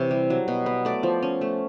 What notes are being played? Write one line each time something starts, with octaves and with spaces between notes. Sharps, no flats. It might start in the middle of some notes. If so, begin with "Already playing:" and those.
Already playing: C3 E3 C#5
G3
F#3
B2
B3
A3 D5
F3
C#4
A3